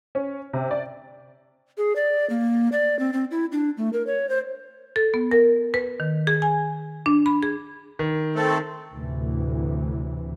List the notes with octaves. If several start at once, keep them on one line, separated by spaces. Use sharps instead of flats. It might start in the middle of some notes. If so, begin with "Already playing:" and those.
C#4
C3
D5
G#4
D5
A#3
D5
C4
C4
E4
D4
A3
A#4
C#5
C5
A4
B3
A#4
B4
D#3
G#4
G#5
D4
B5
G#4
D#3
A3 C4 A4
D2 A2 C3 E3